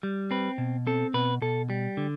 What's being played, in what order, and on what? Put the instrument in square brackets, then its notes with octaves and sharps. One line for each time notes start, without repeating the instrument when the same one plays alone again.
[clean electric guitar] G3
C4 B4
B2
C4 A4
B2 B4
B2 A4
G3
D3